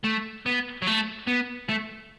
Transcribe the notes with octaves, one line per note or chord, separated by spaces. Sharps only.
A3
B3
F#3
A3
B3
A3